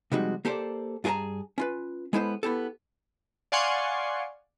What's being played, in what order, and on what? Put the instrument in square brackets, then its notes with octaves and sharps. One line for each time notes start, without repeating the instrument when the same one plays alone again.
[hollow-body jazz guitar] C3 F3 G3 G#3 D#4 F#4
A#3 G4 A4 C5 D5
G2 F4 G#4 A#4 A5 A#5
C#4 F4 B4
G#3 B3 E4 A4 B4 C5
B3 E4 G4 A4
[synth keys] D5 F5 F#5 G#5 C6 C#6